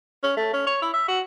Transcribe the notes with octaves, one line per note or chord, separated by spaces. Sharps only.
C#4
A3
C#4
C#5
E4
E5
F#4